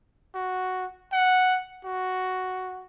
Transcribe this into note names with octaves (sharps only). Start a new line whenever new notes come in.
F#4
F#5
F#4